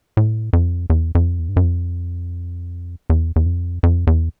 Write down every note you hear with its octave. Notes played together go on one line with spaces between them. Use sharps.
A2
F2
E2
F2
E2
G2
F#2
F2
E2
E2
F2
F2
E2